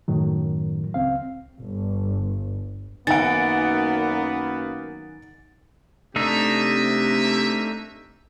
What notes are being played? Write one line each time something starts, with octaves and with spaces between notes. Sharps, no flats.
F#2 A2 D#3 F#3
C#2 C4 F5
G1
F#2 D#3 A#3 B3 F#5 G#5 A6 D7
C3 A3 A#3 D4 D#4 G4 E5